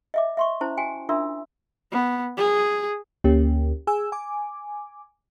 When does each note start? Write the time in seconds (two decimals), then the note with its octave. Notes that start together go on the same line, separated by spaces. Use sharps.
0.14 D#5 E5 D6
0.37 E5 C6 C#6
0.61 C#4 E4 C5 A5 A#5
0.78 F#4 G5 G#5
1.09 D4 F4 A#4 E5 C6 E6
1.92 B3
2.37 G#4
3.24 D2 A#3 C#4 G4
3.87 G#4 G#5 E6
4.12 G#5 D6